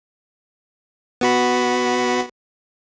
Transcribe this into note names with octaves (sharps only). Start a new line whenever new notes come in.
B3 F#4 B5